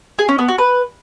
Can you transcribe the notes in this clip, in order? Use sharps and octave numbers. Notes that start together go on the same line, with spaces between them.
G#4
C#4
B3
F#4
B4